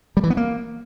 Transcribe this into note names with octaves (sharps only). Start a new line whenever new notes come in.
G3
E3
B3
A#3